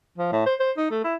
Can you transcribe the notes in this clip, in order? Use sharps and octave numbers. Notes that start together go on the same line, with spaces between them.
F3
A2
C5
C5
D#4
A3
E4